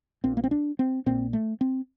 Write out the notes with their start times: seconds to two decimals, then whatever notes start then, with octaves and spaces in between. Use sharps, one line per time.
0.24 A#1 A#2 C4
0.37 A#3
0.44 C4
0.51 D4
0.79 C4
1.06 A#1 A#2 C4
1.33 A3
1.61 C4